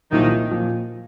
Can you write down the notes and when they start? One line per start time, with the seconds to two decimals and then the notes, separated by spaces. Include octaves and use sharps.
0.12 C2 A#2 D#3 F3 D#4
0.51 A#2 F3